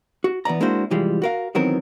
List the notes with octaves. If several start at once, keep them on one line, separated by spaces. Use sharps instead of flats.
F#4
E3 B3 D5 A#5
G#3 A#3 D4 E4 F#4 C5
C2 F2 E3 G3 G#3 F4
F#4 A#4 F5
D#3 E3 F#3 B3 C4 A#4